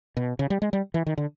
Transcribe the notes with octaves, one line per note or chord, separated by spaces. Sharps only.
B2
C#3
G3
G#3
G3
E3
D#3
D3